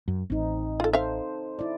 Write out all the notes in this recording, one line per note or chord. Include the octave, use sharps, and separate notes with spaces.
F#2
A1 C4 D#4
F4 A4
A4 C5 E5 F5
E4 D5